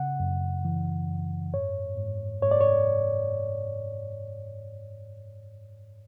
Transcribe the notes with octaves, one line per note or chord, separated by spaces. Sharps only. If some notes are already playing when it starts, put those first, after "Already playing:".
Already playing: C#3 F#5
F#2
E3
F#2
G#2 C#5
G#2
G#2 C#5
D5
C#5